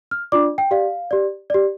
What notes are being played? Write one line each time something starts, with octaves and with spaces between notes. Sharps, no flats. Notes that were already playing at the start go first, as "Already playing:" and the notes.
F6
D4 F4 D5 D6
G5
G4 D5 F5
G4 D5
G4 D5